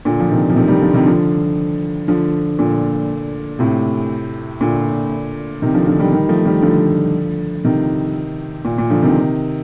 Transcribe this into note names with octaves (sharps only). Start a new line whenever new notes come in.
A#2 D3
F3
C3 D#3
F3
C3 D#3
D#3 G3
D3 F3
C3 D#3
D3 F3
D3 F3
A#2 D3
A2 C3
A#2 D3
C3 D#3
D3 F3
D3 F3
D#3 G3
D#3 G3
F3 A3
D#3 G3
D3 F3
C3 D#3
A#2
A#2
D3 F3
C3 D#3